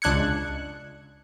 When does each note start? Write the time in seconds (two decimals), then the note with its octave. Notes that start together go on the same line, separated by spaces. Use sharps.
0.02 C#2 D4 F#6 G#6 C#7